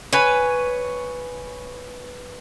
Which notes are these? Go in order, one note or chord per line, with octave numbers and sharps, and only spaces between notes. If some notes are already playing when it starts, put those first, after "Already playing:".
B4 C#5 G#5